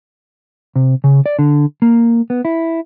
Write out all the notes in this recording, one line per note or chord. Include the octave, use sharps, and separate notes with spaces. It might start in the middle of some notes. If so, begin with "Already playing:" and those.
C3
C#3
D5
D3
A#3
B3
E4